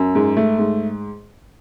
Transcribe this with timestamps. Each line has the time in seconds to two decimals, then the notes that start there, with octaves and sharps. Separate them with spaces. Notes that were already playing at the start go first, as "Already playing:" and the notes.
Already playing: F#2
0.15 G#2
0.37 A3
0.59 G#2